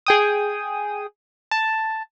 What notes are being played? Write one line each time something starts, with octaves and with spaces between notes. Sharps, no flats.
G#4 G5 D#6
A5